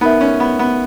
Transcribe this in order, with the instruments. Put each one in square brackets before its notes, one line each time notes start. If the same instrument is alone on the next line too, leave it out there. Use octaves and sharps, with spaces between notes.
[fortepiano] B3 [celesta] D#4 A#4 E5
[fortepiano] C#4
B3
B3